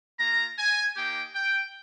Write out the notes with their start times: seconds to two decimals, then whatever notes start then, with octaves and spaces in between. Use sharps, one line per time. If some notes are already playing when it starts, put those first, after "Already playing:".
0.19 A#3 F4 A#5
0.57 G#5
0.96 A#3 D#4 G4 G5
1.35 G5